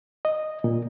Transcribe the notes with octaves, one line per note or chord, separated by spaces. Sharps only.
D#5
A#2